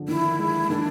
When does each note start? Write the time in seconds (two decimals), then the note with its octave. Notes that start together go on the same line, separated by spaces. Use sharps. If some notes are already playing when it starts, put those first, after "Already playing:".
Already playing: D3 F3
0.08 D#3 E4
0.39 G#3
0.70 D#3 D4